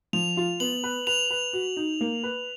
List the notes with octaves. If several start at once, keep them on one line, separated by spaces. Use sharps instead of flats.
F3 F7
F4
B3 F#7
B4
B4 F7
B4
F#4
D#4
A#3
B4